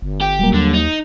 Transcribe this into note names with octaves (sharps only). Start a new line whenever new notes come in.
G1
G4
D#1 F#3 G3 A#3
D#2 D3
D#4